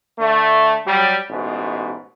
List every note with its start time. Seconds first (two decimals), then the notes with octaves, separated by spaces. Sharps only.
0.18 D3 A3
0.86 F#3 G3
1.29 A1 G#2 B2